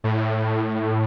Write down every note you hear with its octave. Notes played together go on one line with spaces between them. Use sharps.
A2